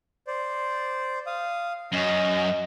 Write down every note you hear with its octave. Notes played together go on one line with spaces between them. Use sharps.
C5 D5
F5 D#6
F#2 C#4 D#5